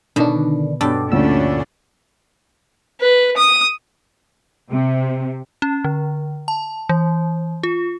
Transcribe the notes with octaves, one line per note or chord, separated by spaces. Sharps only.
B2 D3 D#3 D4
G2 B2 A4 D5 G5
D2 A#2 A3 C#4 D4 E6
B4
D#6
C3
C#4
D3
A5
E3
F4